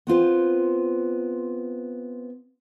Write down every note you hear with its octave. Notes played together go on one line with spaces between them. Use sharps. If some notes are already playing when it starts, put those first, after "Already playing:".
B3 C4 F4 C5